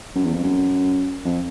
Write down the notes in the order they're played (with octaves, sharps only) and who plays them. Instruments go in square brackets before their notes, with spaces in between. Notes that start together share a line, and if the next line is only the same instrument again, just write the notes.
[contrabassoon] F#2
E2
F2
F#2
F2